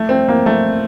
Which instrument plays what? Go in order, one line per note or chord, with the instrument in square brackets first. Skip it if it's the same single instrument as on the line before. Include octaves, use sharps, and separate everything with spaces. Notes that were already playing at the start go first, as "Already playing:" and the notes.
Already playing: [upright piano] A3
C4
A#3
A3